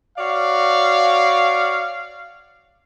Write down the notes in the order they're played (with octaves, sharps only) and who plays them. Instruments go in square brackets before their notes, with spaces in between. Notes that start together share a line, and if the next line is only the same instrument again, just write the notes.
[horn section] F#4 C#5 D5 F5